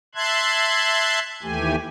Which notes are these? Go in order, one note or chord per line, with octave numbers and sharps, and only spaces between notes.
E5 A5 C6 F#6 G#6
D#2 E3 A3 G4 G#5